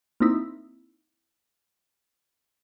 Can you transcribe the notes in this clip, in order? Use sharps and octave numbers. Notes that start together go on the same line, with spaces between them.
A#3 C4 D#4 E4